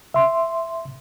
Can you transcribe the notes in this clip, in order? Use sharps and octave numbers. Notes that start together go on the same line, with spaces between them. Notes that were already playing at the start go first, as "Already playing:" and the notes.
E5 C6